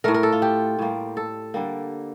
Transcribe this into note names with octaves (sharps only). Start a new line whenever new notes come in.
A2 A3 A#4
A#4
A4
F4
G4
A2 G3 A#3
A4
D3 G3 A#3